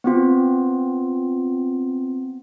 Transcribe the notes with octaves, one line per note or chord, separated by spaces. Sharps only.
B3 C4 F4